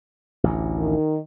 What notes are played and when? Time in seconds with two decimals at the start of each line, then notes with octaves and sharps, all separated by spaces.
0.44 A1 D2
0.78 D#3